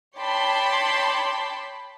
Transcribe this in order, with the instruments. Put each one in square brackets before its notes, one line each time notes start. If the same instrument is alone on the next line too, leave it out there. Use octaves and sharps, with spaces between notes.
[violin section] C#5 G5 A5 B5 C6 D6